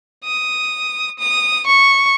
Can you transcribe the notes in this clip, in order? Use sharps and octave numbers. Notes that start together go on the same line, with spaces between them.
D#6
D#6
C#6